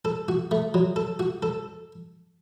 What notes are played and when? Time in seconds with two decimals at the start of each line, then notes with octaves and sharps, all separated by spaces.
0.05 A4
0.28 F#4
0.51 A3
0.74 F#3
0.96 A4
1.20 F#4
1.43 A4